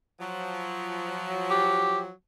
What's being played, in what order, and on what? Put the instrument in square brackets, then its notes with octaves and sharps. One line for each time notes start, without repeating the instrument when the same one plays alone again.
[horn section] F3 F#3
[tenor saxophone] G4